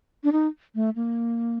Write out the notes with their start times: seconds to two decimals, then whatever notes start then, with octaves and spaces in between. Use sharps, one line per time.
0.24 D4
0.32 D#4
0.75 A3
0.96 A#3